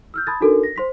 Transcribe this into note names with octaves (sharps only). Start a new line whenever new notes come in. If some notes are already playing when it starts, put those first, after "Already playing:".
E6 F6 G6
A5 B5 C6 D#6 G#6 A6
D4 D#4 F#4 A4 A#4
A#6
C5 C6 B6